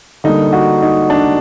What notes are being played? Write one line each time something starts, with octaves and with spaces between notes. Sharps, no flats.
D3 G3 A#3 D#4
F#4
D#4
D4